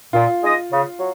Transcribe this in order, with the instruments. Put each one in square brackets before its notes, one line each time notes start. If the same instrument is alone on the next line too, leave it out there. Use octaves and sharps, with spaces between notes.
[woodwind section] A#2 [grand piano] F4
[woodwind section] G#3 D#4 G#4 D#5
C#3
F#3